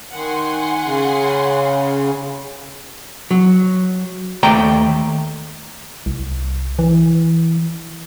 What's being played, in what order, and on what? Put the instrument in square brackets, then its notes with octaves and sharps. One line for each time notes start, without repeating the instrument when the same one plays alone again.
[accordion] D#3 [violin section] F#5 G#5 C6
[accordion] C#3
[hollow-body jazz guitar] F#3
D#2 A3 D5 G5 A#5
[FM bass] C2
E3